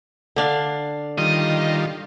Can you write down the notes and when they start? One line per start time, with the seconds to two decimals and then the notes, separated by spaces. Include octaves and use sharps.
0.36 D3 D4 F5
1.18 D#3 G3 F4 D#5